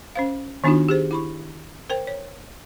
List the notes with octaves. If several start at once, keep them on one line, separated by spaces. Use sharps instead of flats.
C#4 C5 F5
D#3 B3 D4 D#4 F4 F#4
G4 G#4 C5
E4 B5 C#6
A#4 C5 G5
C#5